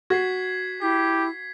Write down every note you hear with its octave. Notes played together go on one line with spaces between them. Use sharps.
F#4 G#6 B6 C7
E4 G4 B6